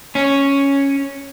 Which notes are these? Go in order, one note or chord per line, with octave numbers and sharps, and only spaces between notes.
C#4